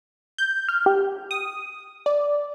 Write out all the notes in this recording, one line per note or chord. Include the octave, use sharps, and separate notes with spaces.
G6
F6
G4
D#6
D5